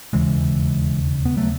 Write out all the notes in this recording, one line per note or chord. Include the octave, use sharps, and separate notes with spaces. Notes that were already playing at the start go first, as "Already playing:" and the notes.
E1 D#2 C#3 E3 G#3
B3
F#3 A3